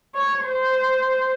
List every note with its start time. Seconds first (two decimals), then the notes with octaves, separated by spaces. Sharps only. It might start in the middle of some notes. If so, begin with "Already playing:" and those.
0.15 C#5
0.44 C5